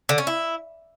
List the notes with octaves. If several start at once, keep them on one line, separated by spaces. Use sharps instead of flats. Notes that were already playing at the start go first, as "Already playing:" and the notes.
D3
C#4
E4